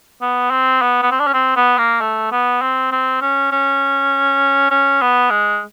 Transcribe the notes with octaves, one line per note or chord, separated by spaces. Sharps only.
B3
C4
B3
B3
C4
D4
C#4
C4
B3
A#3
A3
B3
C4
C4
C#4
C#4
C#4
B3
G#3